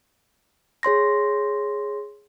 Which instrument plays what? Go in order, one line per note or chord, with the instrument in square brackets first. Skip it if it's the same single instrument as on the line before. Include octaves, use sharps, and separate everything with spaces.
[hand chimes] G#4 C#5 C6 A#6